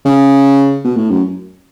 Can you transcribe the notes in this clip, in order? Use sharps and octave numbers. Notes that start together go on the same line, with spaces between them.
C#3
B2
A2
F#2